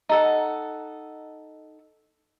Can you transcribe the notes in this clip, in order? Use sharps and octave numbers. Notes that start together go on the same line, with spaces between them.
D#4 A4 F#5